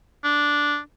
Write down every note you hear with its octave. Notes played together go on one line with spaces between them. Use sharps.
D4